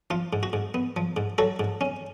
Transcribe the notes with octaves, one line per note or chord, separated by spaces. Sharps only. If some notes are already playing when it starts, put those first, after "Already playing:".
F3 F4
G#2
F#4
G#2
B3
F3
G#2
F#3 F#4 A4
G#2
C#4